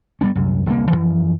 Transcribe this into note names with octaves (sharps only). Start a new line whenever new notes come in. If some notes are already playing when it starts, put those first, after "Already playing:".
G2 G3 B3 C#4
C2 F#2
E1 C2 D3 A#3
F#2 C#3 E3 F3